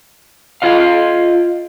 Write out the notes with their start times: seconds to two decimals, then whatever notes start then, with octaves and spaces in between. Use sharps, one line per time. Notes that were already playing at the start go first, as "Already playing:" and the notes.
0.62 F4 D#5 F5